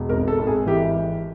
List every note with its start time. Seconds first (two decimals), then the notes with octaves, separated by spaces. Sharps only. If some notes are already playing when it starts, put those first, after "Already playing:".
Already playing: E1
0.09 G#1 A#4
0.28 A4
0.39 G#1
0.47 G#4
0.66 E3 G4